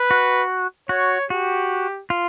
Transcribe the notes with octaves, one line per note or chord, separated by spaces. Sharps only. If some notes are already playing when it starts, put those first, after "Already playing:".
Already playing: B4
F#4
F#4 C#5
F#4 G4
F4